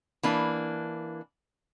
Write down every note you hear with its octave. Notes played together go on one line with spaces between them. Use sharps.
E3 A#3 D4